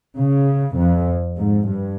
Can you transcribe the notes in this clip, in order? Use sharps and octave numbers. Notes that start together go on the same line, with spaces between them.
C#3
F2
G#2
G2